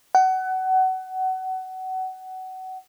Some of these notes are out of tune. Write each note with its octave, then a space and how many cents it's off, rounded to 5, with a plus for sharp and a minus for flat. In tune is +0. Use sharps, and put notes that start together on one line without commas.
F#5 +25